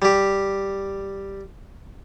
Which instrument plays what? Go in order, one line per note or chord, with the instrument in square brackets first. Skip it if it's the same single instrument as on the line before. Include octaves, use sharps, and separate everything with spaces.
[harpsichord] G3 G4